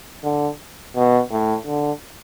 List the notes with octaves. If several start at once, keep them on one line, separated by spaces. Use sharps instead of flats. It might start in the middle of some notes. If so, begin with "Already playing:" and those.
D3
B2
A2
D3